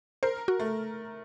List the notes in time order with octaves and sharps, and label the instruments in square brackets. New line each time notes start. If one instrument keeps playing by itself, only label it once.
[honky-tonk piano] A#4 [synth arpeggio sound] C5
[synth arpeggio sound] F#4
[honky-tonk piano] A3